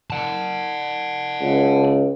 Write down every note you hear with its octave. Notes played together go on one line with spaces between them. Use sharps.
F#5 A5
C#2